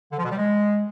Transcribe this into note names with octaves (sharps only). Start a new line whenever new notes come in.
D3
F3
B2
G3
G#3